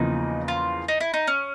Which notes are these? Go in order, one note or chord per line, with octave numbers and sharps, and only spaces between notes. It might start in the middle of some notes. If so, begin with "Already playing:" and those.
Already playing: E2 C#3 F3 A#3 D#4
F4
D#4
E4
D#4
C#4